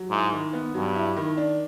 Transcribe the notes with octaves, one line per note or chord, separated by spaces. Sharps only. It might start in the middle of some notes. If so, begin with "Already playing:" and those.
Already playing: F#3
G#2 E4
D#3
B3
G2 F#3
E4
D#3
D4